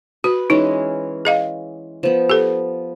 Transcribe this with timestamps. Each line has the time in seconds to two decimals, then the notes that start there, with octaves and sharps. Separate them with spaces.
0.24 F#4 B4
0.50 E3 G#3 C#4 D#4
1.25 G#4 D#5 F5
2.03 F3 B3
2.30 G4 A4